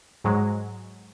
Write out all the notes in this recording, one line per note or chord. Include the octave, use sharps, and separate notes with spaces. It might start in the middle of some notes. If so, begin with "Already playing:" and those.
G#2 F#3 G#3